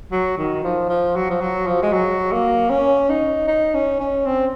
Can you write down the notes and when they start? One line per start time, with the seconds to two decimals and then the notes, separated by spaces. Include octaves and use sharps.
0.12 F#3
0.38 D#3
0.64 F3
0.89 F3
1.16 F#3
1.30 F3
1.41 F#3
1.67 F3
1.82 G#3
1.93 F#3
2.32 A#3
2.70 C#4
3.09 D#4
3.48 D#4
3.74 C#4
4.00 C#4
4.26 C4